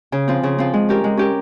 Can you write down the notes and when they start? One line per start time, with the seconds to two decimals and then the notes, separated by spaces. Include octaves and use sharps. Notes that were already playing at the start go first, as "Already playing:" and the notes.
0.12 C#3
0.28 F3 C4
0.43 C#3
0.58 F3 C4
0.74 G#3
0.89 C#4 G4 A#4
1.04 G#3
1.17 C#4 G4 A#4